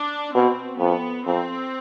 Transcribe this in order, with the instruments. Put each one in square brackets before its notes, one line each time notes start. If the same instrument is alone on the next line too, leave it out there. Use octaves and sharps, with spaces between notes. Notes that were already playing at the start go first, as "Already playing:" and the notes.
Already playing: [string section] D4
[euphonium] B2 [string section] C4
[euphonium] F2 [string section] B3
[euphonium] F2 [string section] C4